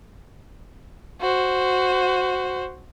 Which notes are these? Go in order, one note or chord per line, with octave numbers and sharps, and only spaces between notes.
F#4 C5